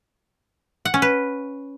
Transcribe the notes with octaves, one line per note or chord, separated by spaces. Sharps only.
F#5
C#4
B4